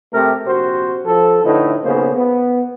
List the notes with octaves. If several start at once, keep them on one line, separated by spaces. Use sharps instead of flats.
C3 A3 C4 G4 A#4
A#1 C3 F#4 C5
F3 A4
A2 D3 D#4 E4 B4
B1 C#3 A#3 B3 C5
B3